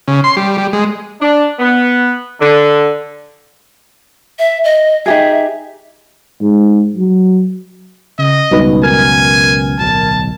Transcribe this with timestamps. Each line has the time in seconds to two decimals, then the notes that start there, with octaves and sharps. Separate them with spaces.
0.08 C#3
0.24 C6
0.37 G3
0.58 G3
0.73 G#3
1.21 D4
1.59 B3
2.40 D3
4.39 E5
4.64 D#5
5.06 D#4 G4 G#4 E5
6.41 G#2
6.97 F#3
8.19 C#3 D#5
8.51 C#2 F#2 B2 G3 D#4 B4
8.83 A#4 G#5 F6 G#6
9.79 D1 B1 A5